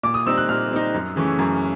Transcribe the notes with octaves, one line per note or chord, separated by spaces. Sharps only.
A#2 D6
D#6
G3 C4 D#4 E6
F#6
A#2 F6
G3 C4 D#4
F#2
C#3 E3 A3 C#4
F#2